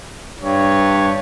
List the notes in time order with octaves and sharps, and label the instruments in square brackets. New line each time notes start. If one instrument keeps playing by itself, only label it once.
[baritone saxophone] G2 [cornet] C#5